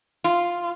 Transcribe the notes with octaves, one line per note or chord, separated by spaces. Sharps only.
F4